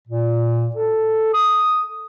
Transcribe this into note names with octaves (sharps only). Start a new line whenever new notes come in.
A#2
A4
D#6